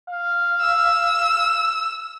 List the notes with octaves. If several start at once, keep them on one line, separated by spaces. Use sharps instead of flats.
F5
E6